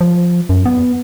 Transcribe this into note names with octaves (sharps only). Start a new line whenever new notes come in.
F3
F#2
B3